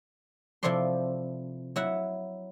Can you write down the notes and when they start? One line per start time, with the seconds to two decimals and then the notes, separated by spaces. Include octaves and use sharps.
0.63 C3 F3 E4 A4 D5 C6
1.76 F#3 E4 E5 F#5